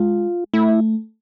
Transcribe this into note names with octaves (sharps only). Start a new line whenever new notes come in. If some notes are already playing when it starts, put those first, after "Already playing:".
Already playing: G#3 F4
A3 E4